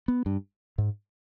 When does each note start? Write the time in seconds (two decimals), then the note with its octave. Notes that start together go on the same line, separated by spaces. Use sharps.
0.08 B3
0.26 G2
0.78 G#2